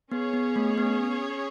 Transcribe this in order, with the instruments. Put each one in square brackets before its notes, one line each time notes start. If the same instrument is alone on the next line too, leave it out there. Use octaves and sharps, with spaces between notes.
[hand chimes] B3 [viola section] C#4 G#4 C#5
[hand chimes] B3
A3
B3